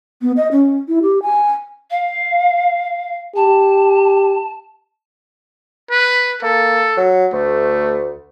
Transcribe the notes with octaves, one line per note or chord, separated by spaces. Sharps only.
B3
D#5
C#4
E4
G4
G#5
F5
G4 A5
B4
A#3 A4
F#3
D2 A3